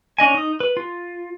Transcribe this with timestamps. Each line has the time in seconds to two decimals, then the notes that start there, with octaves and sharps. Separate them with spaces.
0.18 C#4 D4 D#5 G#5
0.34 D#4 D#6
0.60 B4
0.77 F4